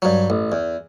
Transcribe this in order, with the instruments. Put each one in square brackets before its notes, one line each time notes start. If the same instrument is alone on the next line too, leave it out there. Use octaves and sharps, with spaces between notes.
[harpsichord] G2 F#3
A1
E2